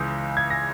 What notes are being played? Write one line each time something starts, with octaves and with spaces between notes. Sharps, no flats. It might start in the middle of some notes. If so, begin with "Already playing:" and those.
Already playing: C#2 C#3 E3 G#3 G6
G#6
A#6